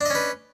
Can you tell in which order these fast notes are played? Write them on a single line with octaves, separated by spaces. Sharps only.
D4 D#5 C#4 B4